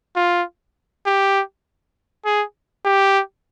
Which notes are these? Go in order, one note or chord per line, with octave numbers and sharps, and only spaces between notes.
F4
G4
G#4
G4